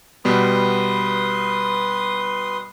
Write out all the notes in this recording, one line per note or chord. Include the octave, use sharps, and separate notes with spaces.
B2 G3 B3 B4 C6 D#6